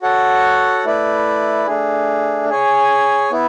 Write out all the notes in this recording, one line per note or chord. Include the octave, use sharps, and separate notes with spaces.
F#4 A4 C#5 F#5
A3 E4 B4 D5
A3 D4 G#4
G#4 C#5 G#5
B3 E4